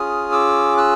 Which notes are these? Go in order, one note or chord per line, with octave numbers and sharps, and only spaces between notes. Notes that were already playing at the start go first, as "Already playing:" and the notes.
Already playing: C#4 F4 G#4 D#6 F6
D6 E6
E6 F#6